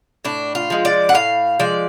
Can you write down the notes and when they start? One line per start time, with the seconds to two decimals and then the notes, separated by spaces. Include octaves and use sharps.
0.25 A2 D4
0.55 F4
0.70 F3 G#3
0.85 D5
1.09 F#5
1.14 A2 F5
1.60 F3 G#3 D5